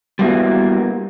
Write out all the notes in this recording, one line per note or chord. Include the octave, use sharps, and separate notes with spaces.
G3 A#3 B3 E4 F#4